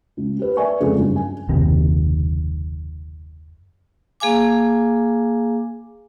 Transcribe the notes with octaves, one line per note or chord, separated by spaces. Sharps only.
C#2
G4 B4
B4 D5 E5 G#5 C#6
F1 C#2 F4 G#4 A4
F#1 G2
G#5
F#1 D#2 C3
A#3 G#4 F5 G#5 D6